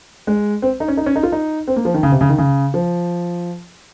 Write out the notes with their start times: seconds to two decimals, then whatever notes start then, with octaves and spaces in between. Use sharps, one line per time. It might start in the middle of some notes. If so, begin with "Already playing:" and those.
0.27 G#3
0.62 C4
0.80 D#4
0.88 C#4
0.97 D#4
1.06 C#4
1.16 D#4
1.23 F4
1.32 D#4
1.67 C4
1.76 A#3
1.85 F3
1.94 D#3
2.03 C#3
2.12 C3
2.21 C#3
2.29 D#3
2.38 C#3
2.74 F3